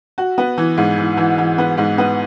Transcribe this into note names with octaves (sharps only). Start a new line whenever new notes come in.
F#4
B3
E3
G#2
E3
E3
E3
B3
G#2
B3